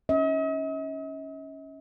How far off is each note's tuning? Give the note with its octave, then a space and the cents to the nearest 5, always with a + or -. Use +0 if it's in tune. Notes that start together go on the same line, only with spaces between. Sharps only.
C#4 +0 D#5 +45